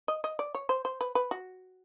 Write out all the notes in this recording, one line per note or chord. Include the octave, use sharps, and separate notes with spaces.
D#5
D#5
D5
C#5
C5
C5
B4
B4
F#4